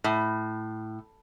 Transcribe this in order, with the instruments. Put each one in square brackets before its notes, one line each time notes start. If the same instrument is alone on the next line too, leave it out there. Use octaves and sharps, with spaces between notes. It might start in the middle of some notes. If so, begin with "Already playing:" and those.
[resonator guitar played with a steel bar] A2